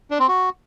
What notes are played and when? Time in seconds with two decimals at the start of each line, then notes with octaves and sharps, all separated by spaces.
0.11 D4
0.19 C4
0.28 F#4